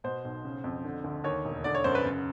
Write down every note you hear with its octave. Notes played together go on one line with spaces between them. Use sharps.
B2 C5
B1
C#3
F2
D3
D2
D#2 C#5
E1
D3 D5
C#5
F#2 C5
B4
C#3